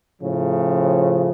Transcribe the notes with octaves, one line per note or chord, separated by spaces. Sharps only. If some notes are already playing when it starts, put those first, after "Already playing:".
A2 C#3 F3